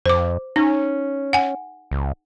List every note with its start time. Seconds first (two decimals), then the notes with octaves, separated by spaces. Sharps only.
0.06 F2 C5 D6
0.56 C#4 D#4
1.33 F#5 G#5
1.91 C#2